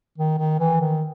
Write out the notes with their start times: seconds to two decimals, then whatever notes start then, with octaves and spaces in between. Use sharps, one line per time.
0.18 D#3
0.38 D#3
0.59 E3
0.81 D#3